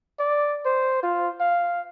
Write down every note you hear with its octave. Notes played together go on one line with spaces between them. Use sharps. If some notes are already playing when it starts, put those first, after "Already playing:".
D5
C5
F4
F5